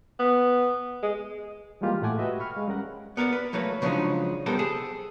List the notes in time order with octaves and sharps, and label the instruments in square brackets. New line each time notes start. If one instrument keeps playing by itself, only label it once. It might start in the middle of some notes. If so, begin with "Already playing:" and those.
[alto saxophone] B3
G#3
[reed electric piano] E3 G3 G#3 A#3 F4 G4
A2 A3 F#5 G#5 D6
F#4 G4 B4 D#5 E5 G5
B5 C#6 F6
G#3 F5
G3 C#4 A#4 F#5
[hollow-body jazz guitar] B3 A#4 C#5 D5
B4
F#3 A3 A#3 B4
C#3 F3 F#3 G#3 D4 D#4
C3 G3 B3 A4 A#4 C5
G#4 A4